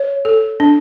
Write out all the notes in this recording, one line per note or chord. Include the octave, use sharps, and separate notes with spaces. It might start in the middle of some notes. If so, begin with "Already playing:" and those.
Already playing: C#5
A4
D4